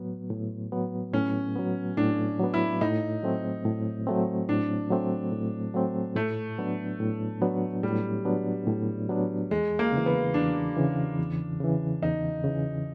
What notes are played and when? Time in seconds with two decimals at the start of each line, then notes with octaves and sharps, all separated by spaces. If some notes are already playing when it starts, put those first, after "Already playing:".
Already playing: A2 F#3 B3
0.30 A2
0.72 F#3 B3
1.13 A2 C#4
1.55 F#3 B3
1.97 A2 D4
2.39 F#3 B3
2.54 E4
2.81 A2 D#4
3.23 F#3 A3 C4
3.65 A2
4.07 F#3 A3 C4
4.48 A2 D4
4.90 F#3 A3 C4
5.32 A2
5.74 F#3 A3 C4
6.16 A2 A3
6.58 F#3 B3 D4
7.00 A2
7.42 F#3 B3 D4
7.83 A2 G3
8.25 F#3 B3 D4
8.67 A2
9.09 F#3 B3 D4
9.51 E2 G#3
9.79 A#3
9.93 C#3 E3
10.06 B3
10.34 E2 D4
10.77 C#3 E3
11.19 E2
11.60 C#3 E3
12.02 E2 D#4
12.44 C#3 E3